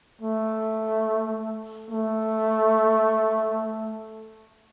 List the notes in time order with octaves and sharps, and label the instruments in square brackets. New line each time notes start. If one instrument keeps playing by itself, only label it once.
[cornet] A3
A3